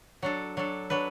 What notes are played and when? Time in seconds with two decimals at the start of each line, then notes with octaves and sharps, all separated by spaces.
0.23 F#3 D4 A4
0.57 F#3 D4 A4
0.90 F#3 D4 B4